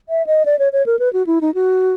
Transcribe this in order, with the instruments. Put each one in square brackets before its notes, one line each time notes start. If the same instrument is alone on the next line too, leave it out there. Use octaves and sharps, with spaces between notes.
[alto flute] E5
D#5
D5
C#5
C#5
A#4
B4
F#4
E4
D#4
F#4